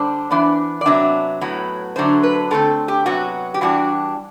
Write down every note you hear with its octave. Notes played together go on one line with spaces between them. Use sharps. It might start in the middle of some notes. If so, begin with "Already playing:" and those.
Already playing: D3 G3 D4 C5
E3 B3 D4
D5
C3 F#3 B3 D4 E5
A2 F#3 B3
D3 F#3 A3 D4 C5
B4
D3 A3 C4 A4
G4
C3 F#3 B3 F#4
G4
E3 G3 D4 F#4